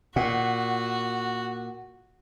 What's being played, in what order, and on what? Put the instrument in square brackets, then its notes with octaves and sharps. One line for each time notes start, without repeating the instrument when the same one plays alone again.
[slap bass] A#2 [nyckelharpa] F#4 [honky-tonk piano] F#5